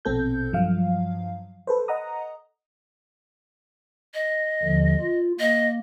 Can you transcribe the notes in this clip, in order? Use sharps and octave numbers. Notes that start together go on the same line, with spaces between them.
A#1 B2 C4 A4 G6
G2 F3 F#3 F5
A4 B4 C5
D#5 F#5 A#5 D#6
D#5
D#2 D3 F3
F4
A#3 D#5